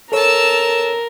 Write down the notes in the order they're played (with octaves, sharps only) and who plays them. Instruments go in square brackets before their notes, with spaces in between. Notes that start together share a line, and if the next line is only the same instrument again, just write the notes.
[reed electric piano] A4 C#5 [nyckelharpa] A#4 [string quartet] A5 E6